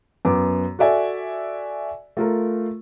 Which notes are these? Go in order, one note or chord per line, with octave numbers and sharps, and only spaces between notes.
F#2 B3 D6
F#4 A4 D5 E5 G#5
A3 F4 A#4